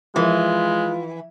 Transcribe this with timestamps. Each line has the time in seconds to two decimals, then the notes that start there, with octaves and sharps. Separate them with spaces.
0.16 E3 F3 G#3 F4 A#4